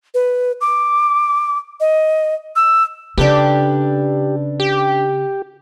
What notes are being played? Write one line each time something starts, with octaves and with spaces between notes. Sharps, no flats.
B4
D6
D#5
E6
C#3 D4 G4 A4 B4
G4